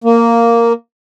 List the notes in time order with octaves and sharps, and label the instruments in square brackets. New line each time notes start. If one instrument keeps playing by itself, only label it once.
[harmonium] A#3